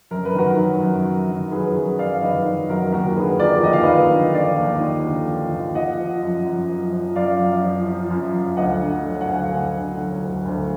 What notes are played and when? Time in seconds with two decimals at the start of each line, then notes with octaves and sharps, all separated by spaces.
0.11 F#2 A#4
0.25 B4
0.35 D#3 F#4 A#4
0.58 F#3
0.81 F#2
1.05 F#2
1.29 D#3
1.52 F#3 G#4 B4
1.75 F#2
1.99 F#2 D5 F5
2.22 D#3 B4 D#5
2.46 F#3
2.70 F#2 F#4 A#4
2.93 D#2 F#4 A#4
3.16 D3 G#4 B4
3.39 F3 A#4 D5
3.63 D#2 D#5
3.73 F5
3.83 D#2 B4 D#5
4.10 D3
4.34 F3 D5 F5
4.57 D#2
4.81 D#2
5.04 D3
5.27 F3
5.52 D#2
5.75 F3 D#5 F#5
5.98 F3
6.22 F#2
6.46 F#2
6.69 F3
6.92 F3
7.15 F#2 D5 F5
7.39 F#2
7.63 F3
7.87 F3
8.10 F#2
8.34 F#2
8.57 D2 D#5 F#5
8.80 D3
9.04 F#3
9.21 F#5
9.27 D2 F5 G#5
9.51 D2
9.75 D3
9.98 F#3
10.22 D2
10.45 D2